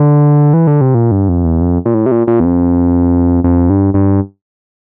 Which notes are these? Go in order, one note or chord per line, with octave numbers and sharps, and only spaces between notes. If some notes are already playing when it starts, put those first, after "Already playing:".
Already playing: D3
E3
D3
C3
A#2
G2
F2
E2
F2
A#2
A2
C3
A#2
A#2
E2
F2
F2
G2
G2